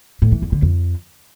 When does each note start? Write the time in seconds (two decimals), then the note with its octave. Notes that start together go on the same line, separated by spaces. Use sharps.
0.22 A2
0.32 E3
0.42 E2
0.52 D3
0.62 F2